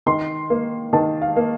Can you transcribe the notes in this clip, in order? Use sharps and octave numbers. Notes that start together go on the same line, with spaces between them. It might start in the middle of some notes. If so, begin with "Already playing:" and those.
D#3 C6
A#3
D#3 A5
F5
A#3